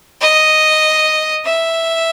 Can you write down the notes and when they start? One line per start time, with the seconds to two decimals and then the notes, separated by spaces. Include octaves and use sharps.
0.21 D#5
1.45 E5